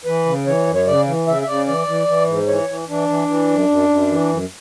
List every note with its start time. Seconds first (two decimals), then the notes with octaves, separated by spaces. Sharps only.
0.05 E3 B4
0.26 C#3
0.46 E3 C#5
0.67 F#2
0.75 C#5
0.87 C#3 D5
1.07 E3
1.27 C#3 E5
1.42 E5
1.48 C#3 D5
1.67 E3 D5
1.87 E3
2.07 E3
2.27 G#2
2.48 E3 C#5
2.69 E3
2.89 E3 D4
3.09 E3
3.28 E3
3.49 F#2
3.69 F#2
3.89 F#2
4.10 E3
4.30 F#2